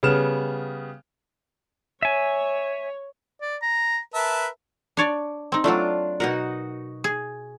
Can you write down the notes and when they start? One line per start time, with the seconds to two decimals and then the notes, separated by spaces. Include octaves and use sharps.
0.03 C#3 G3 B3 F6 E7
2.02 C#5 E5 G#5
3.41 D5
3.62 A#5
4.14 A#4 B4 E5 A5
4.97 D4 C#5 D5
5.52 C4 D#4
5.64 F#3 A3 D4 F4 D5
6.20 B2 D#4 F#4 A#4 F#5
7.04 G#4